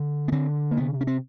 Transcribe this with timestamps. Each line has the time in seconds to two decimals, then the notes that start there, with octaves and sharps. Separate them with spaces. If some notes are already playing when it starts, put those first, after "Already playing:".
Already playing: D3
0.28 B3
0.32 D3 C4
0.71 A#3
0.77 C3 B3
1.01 C#4
1.07 C4